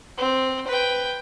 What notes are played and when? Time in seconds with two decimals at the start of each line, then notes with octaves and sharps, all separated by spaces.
0.18 C4
0.67 B4 G5